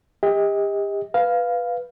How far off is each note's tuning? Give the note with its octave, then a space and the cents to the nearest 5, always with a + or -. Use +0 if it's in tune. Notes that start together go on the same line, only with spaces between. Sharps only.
G4 +35 D#5 +30
B4 +0 F5 +0